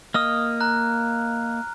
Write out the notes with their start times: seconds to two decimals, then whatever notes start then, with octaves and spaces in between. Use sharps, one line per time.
0.14 A#3 D#5 D#6 F6
0.60 A#5 F#6